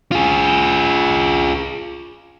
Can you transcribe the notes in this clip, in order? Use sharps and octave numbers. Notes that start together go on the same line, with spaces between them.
F4 G#4